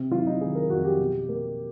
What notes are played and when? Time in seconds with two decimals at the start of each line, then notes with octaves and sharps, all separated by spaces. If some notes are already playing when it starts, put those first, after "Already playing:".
Already playing: C3
0.11 F#3 F4
0.19 E4
0.26 D#4
0.41 D#3 G#4
0.55 A#4
0.70 F2 F#4
0.85 G4
0.99 B2
1.29 A#3